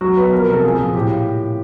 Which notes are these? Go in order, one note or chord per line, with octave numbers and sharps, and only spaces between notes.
F#3 F#4
B2 B4
F3 A#4
C3 A#4
A4
F3 G#4
A#2
A2 G4